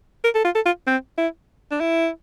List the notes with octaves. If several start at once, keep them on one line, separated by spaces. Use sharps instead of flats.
A#4
A4
F4
A4
F4
C4
E4
D4
E4